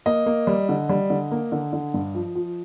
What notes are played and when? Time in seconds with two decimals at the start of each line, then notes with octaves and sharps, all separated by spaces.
0.06 A#3 D#5
0.26 A#3
0.47 G3
0.69 D3
0.89 G3
1.10 D3
1.31 A#3
1.52 D3
1.73 D3
1.94 G2
2.15 F3
2.35 F3